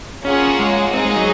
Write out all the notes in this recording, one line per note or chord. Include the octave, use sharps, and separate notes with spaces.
A#3 C#4 F4 G#4 C#5 F#5
G#3
C4 D#4 G#4 D#5
G#3
F#3